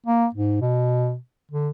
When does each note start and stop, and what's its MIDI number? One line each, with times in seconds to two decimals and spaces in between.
0.06 0.26 58
0.35 0.57 44
0.61 1.15 47
1.52 1.69 50